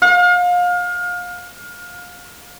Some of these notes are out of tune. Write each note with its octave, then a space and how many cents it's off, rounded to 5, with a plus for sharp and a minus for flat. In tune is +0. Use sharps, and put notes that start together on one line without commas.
F5 +30